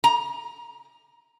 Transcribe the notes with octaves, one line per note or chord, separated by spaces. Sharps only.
A#5